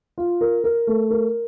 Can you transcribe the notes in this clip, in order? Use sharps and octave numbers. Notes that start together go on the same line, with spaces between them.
F4
A#4
A#4
A3
A#4